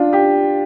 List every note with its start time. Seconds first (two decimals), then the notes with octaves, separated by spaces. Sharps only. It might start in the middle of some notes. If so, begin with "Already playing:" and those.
Already playing: D4 F4
0.13 G4